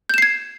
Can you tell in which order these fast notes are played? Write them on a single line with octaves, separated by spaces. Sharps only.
G6 E7 C7 G#6